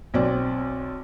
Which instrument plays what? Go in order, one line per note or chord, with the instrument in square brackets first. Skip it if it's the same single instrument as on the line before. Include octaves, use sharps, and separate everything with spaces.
[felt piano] B1 C4 D5